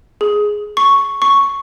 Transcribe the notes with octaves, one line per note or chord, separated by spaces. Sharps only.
G#4
C#6
C#6